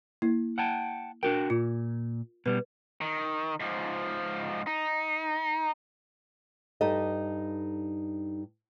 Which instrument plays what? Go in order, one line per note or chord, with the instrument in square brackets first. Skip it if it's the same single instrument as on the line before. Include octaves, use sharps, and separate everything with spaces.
[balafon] A#3 E4
[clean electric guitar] F#5 G5 A5
[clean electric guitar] D4 F#4 G5 [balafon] A#4
[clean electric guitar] A#2 [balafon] F4
[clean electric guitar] B2 G3 [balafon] B4
[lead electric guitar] D#3
G#2 F3
D#4
[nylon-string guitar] G2 D#4 G4 A4 D#5